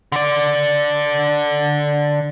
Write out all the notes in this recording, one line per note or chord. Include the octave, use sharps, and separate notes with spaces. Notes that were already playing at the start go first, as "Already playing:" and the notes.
D3 D5